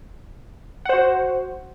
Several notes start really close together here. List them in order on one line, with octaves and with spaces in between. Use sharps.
F#5 C5 F#4